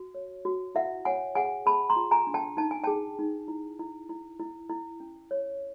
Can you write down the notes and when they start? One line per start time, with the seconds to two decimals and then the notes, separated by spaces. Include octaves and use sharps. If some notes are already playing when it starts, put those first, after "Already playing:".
Already playing: F#4
0.15 C#5
0.45 F#4
0.75 E4 E5 F#5
1.05 C#5 F#5 G#5
1.35 G#4 F#5 G#5
1.66 G#4 A5 B5
1.90 A#5 C6
1.96 F4
2.11 G#5 A#5
2.27 D4
2.34 G5 A5
2.57 D#4 A5
2.71 G#5
2.84 G#4 G5 A5
3.19 D#4
3.48 E4
3.79 E4
4.09 E4
4.39 E4
4.69 E4
5.00 C#4
5.31 C#5